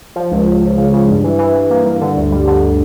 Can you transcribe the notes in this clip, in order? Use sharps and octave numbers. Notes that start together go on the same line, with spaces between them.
F3
C#2
C#2
C#2
C#3
C#3
G2
E3
E3
E3
A#3
G2
D3
D2
G3
D3